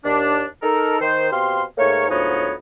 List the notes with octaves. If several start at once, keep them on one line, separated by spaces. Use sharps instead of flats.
D#2 D4
D#4 A4 A#4
D#3 C5
B2 C4 G4 F5 C6
G#2 A3 A#3 A#4 C#5
D2 G#2 F3 B3 D#4 C#5